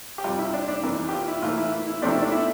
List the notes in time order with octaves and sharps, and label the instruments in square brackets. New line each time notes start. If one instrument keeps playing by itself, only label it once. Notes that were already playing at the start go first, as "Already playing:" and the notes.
[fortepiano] G4
F2 C3 G3 F4
E4
D4
D4
F2 E3 A#3
G4
F4
E4
A2 E3 A#3 F4
E4
E4
E2 C3 F3 A3 C4 D4
E4
D4
E4